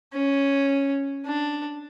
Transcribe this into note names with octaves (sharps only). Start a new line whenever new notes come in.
C#4
D4